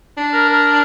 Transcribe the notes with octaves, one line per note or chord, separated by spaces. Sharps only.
D4
A#4
A#4